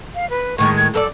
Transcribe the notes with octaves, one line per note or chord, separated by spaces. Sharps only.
F5
B4
A2 D#3 G#3 C#6
G#6
F#2 A4 A#4 D5